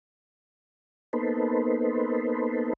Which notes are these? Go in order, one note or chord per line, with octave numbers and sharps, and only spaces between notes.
A#3 B3 D#4 A4 B4 C5